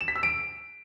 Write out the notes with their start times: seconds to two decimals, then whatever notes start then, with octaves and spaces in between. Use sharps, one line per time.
0.01 E7
0.08 B6
0.16 E6
0.23 D7